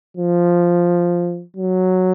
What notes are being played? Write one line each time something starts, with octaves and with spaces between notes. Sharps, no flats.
F3
F#3